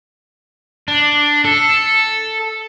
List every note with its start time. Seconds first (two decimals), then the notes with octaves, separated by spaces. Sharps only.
0.88 D4
1.45 A4